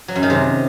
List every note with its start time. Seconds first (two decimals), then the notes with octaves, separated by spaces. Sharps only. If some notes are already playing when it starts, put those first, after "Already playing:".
0.08 F#3
0.16 F#2
0.23 D#3
0.30 C3